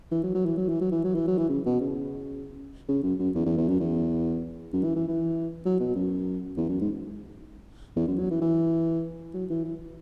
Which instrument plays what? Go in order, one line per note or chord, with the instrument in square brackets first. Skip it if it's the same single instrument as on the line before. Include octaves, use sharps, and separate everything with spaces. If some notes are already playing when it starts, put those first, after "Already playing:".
[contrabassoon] E3
F#3
F#3
E3
F#3
E3
F#3
E3
F#3
E3
F#3
E3
C#3
B2
C#3
C#3
F#2
F#2
E2
E2
E2
F#2
E2
F#2
E3
E3
E3
F#3
B2
F#2
E2
F#2
G#2
E2
F#2
F#3
E3
E3
F#3
E3
E3